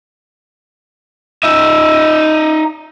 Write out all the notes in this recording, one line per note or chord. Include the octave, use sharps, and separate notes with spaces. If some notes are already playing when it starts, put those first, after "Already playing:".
D#4 E5